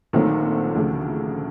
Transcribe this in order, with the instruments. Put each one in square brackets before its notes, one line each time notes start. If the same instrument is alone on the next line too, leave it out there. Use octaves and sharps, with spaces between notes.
[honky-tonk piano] A#1 A#2 F#3 A3 C4 [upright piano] D#3
[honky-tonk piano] D2 C#3 F3 A3